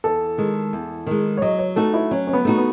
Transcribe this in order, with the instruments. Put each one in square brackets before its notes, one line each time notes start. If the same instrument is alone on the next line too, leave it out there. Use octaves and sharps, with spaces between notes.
[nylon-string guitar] E2 [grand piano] A4
[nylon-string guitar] D#3 G#3
E2
D#3 G#3
[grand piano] C#5
[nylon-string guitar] F#3 [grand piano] D#5
[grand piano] C#5
[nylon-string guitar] A3 D#4 F#4 [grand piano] A4
[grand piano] E4
[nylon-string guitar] F#3 [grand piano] C#4
[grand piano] C#4
B3
[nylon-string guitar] A3 D#4 F#4
[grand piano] B3